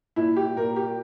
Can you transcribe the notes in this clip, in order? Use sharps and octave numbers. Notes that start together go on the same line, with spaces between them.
A#2 E4
G4
A#2 A#4
G4